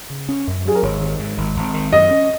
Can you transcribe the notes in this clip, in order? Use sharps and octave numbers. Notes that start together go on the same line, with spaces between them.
C#3
C#4
F#2
F#3 G#4
A#4
G#1 C#5
D#3
G#2
G#1
G#1
D#3
F#2 D#5
C#4